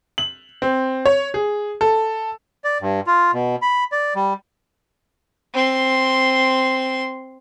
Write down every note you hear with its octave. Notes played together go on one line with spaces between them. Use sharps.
F#7
C4
C#5
G#4
A4
D5
G2
F4
B2
B5
D5
G3
C4 C6